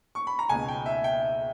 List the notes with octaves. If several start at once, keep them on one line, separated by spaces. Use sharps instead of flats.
C#6
B5
A#5
C#2 B2 G#5
G5
E5
G5